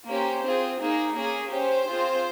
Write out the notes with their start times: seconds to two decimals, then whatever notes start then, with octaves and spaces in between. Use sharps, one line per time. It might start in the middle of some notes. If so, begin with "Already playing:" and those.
0.08 A#3 C#4 G4 C5
0.45 C4 F4 G#4
0.81 A#3 D#4 G#4
1.16 A#3 C#4 G#4
1.52 C#4 G4 C5
1.88 C4 F4 G#4